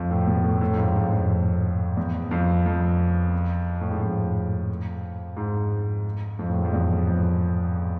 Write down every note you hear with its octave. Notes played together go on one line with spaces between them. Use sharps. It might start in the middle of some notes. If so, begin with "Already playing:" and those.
Already playing: F2
A2
B2
A2
A2
F2
G#2
F2
F2
E2
F2
F2
A2
G#2
F2
G#2
F2
A2
G#2
F2
E2
F2